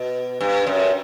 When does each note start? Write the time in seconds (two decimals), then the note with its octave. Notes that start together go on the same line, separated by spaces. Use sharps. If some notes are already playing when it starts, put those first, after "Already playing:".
Already playing: B2
0.41 G2
0.67 F#2